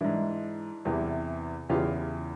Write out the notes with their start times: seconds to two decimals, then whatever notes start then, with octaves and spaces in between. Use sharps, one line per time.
0.01 G#2 E3 D4 E4
0.85 E2 C3 E3
1.69 E2 C#3 E3 F4 G4